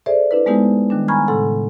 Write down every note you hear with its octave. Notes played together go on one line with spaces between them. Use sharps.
G#4 A4 C5 D5 E5
D4 E4 B4
G#3 A3 B3 D#4 E4 G4
D#3 G3 D4
G#5 A#5 B5 C#6 F6 G#6
A2 C#3 A4 F#5 C6